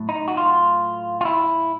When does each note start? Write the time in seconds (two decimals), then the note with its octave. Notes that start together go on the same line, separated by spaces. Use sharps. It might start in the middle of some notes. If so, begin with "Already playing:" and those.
Already playing: A2 F#3 A3
0.09 D#4
0.28 F#4
0.37 F4
1.21 F4
1.25 E4